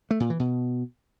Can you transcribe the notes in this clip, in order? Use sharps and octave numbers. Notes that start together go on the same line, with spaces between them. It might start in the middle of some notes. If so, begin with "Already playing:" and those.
A3
A#2
E3
B2